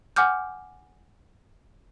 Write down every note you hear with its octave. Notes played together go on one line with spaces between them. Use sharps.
F#5 G#5 D6 F6 G6